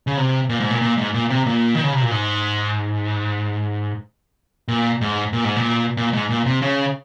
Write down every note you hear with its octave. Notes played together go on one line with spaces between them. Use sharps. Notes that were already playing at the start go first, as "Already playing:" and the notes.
C#3
C3
A#2
G#2
A#2
A#2
G#2
A#2
C3
A#2
D#3
C#3
C3
A#2
G#2
A#2
G#2
A#2
G#2
A#2
A#2
G#2
A#2
C3
C#3